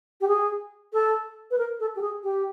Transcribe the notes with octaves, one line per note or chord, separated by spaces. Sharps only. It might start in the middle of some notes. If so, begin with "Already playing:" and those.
G4
G#4
A4
B4
A#4
A4
G4
G#4
G4